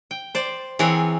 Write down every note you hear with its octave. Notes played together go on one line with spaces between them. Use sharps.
G5
C5 D5
E3 C4 G#4 A#4 C#5 F#5